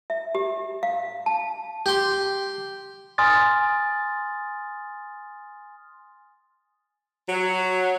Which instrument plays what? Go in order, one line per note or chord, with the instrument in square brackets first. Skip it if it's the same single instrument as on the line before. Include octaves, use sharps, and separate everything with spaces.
[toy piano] E5
G4
F5
A5
[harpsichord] G4 C6
[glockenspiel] G#5 C6 D#6 F6 A6
[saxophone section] F#3